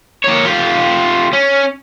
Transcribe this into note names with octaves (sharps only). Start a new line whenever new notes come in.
A#3 C#5
F4 G4
C#4